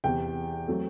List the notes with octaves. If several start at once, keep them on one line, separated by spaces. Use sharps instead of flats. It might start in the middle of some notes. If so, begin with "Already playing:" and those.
E2 C3 E3 G5
F#3 A3 C4